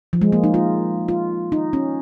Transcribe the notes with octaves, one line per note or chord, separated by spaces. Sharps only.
F3
G#3
A#3
D#4
F4
F4
D#4
C#4